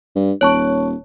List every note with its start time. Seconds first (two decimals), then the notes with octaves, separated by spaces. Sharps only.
0.15 G2
0.41 D#1 C#5 A5 C#6